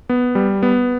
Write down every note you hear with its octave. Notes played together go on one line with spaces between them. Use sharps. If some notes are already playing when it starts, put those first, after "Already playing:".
B3
G3
B3